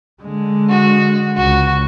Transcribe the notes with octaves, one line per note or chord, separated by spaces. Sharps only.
D3 G#3
F#4
C#2 F#4